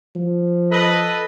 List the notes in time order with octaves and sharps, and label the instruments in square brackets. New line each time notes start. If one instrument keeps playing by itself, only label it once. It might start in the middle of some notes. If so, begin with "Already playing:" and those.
[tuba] F3
[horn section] A4 B4 D#5